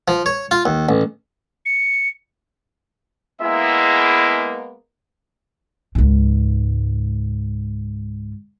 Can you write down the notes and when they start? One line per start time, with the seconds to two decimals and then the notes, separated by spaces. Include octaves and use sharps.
0.08 F3
0.26 C#5
0.51 F4
0.66 D#2
0.89 A1
1.66 C#7
3.42 G#3 A#3 B3 E4 G#4 E5
5.95 C#2 G#2